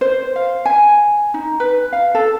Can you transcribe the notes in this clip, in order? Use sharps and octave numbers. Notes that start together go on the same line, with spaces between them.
C5
F5
G#5
D#4
B4
F5
A4